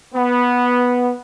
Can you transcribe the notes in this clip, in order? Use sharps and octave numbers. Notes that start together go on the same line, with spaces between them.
B3